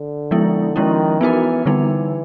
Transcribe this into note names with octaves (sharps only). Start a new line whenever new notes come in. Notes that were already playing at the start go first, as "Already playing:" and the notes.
Already playing: D3
F3 G#3 B3 E4
D#3 F3 G#3 C#4 E4
E3 B3 D#4 F#4 A#4
D3 E3 G3 B3 D#4